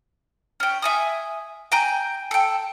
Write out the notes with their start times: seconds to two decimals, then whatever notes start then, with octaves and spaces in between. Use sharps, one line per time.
0.60 C#4 G5
0.82 E5 G#5 D#6
1.72 G5 G#5 A#5 G6
2.31 A4 G5